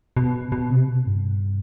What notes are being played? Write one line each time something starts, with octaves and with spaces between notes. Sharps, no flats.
B2
B2
C3
B2
G2